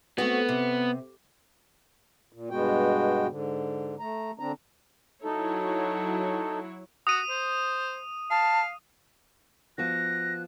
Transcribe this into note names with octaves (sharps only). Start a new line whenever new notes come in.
A3 B3 C4 F#4
C3
A#2
G2 B2 G#3 B3 F#4 G5
G#2 D3
A3 A#5
D3 C4 D4 A#5
F#3 D#4 E4 A4 C#5
F#4 D#6 D#7
C5
F5 A5
F3 B3 F#4 F#6 A#6